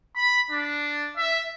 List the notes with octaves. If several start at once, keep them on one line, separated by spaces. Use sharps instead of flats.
B5
D4
E5